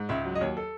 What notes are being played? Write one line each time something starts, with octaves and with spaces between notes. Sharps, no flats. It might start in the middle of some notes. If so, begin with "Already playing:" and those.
Already playing: G#2
C#2 E5
F#3
D#5
D#2 C#5
A4